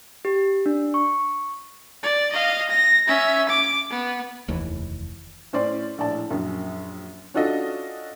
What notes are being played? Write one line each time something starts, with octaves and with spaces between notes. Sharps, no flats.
G4
D4
C#6
D5
D#5 F5
A#6
C#4 E5
D6
B3
F1 D#2 E3
A2 C#4 C5 D5 C6
A#1 A2 D5 A5
A#1 F#2
C#4 D4 F4 F#4 A4 D#5